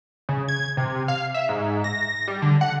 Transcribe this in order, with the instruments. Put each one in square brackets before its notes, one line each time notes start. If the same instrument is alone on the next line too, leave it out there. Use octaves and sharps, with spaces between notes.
[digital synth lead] C#3
G#6
C3
F5
E5
G#2
A#6
G3
D3
F#5